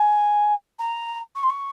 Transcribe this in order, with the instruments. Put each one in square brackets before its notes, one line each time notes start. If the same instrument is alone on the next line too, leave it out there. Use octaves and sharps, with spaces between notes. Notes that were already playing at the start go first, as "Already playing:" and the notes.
Already playing: [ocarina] G#5
A#5
C#6
C6
C#6